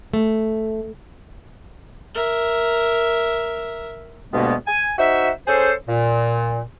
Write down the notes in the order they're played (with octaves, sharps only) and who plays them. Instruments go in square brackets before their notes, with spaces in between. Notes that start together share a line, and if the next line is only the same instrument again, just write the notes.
[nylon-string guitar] A3
[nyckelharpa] A#4 E5
[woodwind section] D2 G2 B2 G#3 A#3 B3
G#5
D#4 F#4 C5 E5
C#4 G#4 A4 C5
A#2